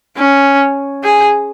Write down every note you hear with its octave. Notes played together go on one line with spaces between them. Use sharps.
C#4
G#4